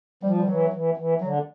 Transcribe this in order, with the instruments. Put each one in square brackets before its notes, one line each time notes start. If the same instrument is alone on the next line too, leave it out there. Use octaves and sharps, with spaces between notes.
[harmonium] F3 [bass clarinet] G3
[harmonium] D#3 [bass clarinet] G3
[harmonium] E3 [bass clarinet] F#3
[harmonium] E3
E3
[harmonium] D3 [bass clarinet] F#3